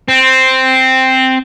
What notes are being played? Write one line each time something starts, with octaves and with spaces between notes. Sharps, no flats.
C4